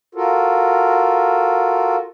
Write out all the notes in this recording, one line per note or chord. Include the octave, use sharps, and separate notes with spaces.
F4 F#4 A4 A#4